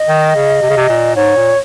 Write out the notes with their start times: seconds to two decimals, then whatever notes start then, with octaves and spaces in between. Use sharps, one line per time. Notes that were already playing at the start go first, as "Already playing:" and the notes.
Already playing: D#5
0.08 D#3
0.35 C#3
0.62 C3
0.69 C#3
0.77 C3
0.89 A#2
1.16 G#2 C#5
1.36 A#2